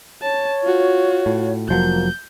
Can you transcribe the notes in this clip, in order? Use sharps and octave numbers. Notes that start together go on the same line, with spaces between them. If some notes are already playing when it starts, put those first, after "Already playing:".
C#5 A5
F4 F#4
A2
F1 F3 F#3 A#3 G6